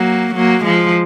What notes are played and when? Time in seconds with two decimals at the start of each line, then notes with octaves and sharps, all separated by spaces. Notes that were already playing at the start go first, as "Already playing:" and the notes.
Already playing: F#3 A#3
0.35 F#3 A#3
0.64 F3 G#3